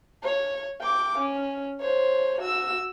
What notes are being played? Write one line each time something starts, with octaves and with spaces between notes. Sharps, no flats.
C#5
G5 D6
C#4
C5 C#5
F#4 E6